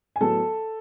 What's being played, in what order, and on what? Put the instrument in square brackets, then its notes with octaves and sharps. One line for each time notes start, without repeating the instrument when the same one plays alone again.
[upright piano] G#5
A2 F#3 B3 A4 A5